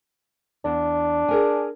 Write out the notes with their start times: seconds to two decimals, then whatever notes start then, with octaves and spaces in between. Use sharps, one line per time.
0.65 E2 D4
1.29 G#4 A#4 G#5